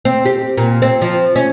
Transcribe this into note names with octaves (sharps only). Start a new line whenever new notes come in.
C4
G4
A#2
C4
F3
C#4